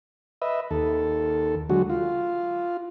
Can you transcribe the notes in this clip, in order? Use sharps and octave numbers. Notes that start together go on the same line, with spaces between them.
B4 D#5 E5
D#2 A4
D3 F#3 G#3 F#4
F4